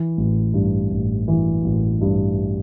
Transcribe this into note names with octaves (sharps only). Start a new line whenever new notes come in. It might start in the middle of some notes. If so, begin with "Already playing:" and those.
Already playing: E3
A1
G2
A1
E3
A1
G2